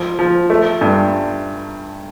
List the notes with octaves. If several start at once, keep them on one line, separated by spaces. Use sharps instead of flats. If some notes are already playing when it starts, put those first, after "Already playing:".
Already playing: F3
F3
A3
G2